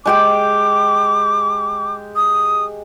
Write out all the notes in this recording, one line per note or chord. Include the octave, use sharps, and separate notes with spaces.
G#3 G4 G5 D6
D#6